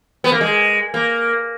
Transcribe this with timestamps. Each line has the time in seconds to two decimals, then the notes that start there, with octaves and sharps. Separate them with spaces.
0.24 B3
0.32 A#3
0.41 G#3
0.94 A#3